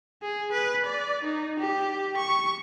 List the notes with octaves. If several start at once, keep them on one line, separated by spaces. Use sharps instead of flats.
G#4
B4
D5
D#4
G4
C#6